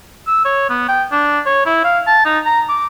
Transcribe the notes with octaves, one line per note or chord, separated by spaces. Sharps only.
E6
C#5
B3
G5
D4
C#5
E4
F5
A5
D#4
A#5
D6